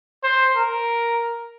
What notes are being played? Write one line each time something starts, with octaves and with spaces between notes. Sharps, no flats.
C5
A#4